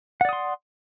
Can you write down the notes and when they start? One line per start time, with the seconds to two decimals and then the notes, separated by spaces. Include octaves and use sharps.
0.21 F#5
0.25 D5
0.29 D#6
0.33 C6